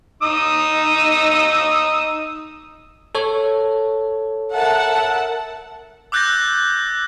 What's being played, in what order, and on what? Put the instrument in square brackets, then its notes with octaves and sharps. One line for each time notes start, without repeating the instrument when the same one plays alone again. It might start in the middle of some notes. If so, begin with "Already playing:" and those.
[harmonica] D#4 D#6 E6
[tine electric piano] A4 C#5
[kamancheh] A#4 E5 [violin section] F#5 A5
[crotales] D6 E6 F#6 G6 A6 A#6